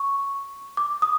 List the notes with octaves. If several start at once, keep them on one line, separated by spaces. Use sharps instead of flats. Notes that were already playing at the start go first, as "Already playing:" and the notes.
Already playing: C#6
D6
D#6